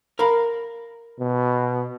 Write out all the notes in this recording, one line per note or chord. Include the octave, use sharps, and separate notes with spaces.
A#4 F5 B5
B2